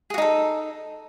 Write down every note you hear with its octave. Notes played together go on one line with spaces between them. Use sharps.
D#4 F#4 G#4 A4